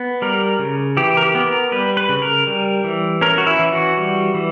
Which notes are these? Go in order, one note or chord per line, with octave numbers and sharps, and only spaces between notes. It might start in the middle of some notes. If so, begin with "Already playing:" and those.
Already playing: B3
G3 A#4
C#3
E3 G4
A#4
G4
B3
A#4
G3 B4
B4
C#3
A#4
G3
E3
C#4 A#4
F#4
E4
E3
F#4
G3
E3